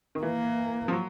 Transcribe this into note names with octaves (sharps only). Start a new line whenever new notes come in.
D#3
E3 A#3
F3
F#3